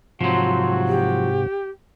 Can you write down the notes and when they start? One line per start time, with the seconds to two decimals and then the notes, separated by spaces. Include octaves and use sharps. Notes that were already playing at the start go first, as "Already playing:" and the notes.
0.21 G#2 C3 F3 F#3 C4 F#4
0.88 G4